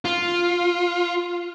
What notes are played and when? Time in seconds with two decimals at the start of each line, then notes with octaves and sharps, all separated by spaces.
0.05 F4